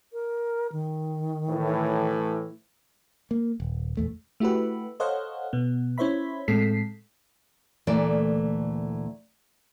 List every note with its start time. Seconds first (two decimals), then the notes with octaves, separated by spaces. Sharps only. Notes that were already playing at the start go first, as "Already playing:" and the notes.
0.13 A#4
0.72 D#3
1.50 A2 E3
3.31 A#3
3.60 D#1
3.97 A#1 E2 A3
4.40 A3 E4 F#4 G4 B4
5.00 A4 C5 C#5 D#5 F5 F#5
5.53 B2 B3
5.98 C#4 E4 C5 C#5 E5 B5
6.48 A2 G#3 C4 A4 B6 C7
7.87 D2 A#2 E3 A3 A#4 D5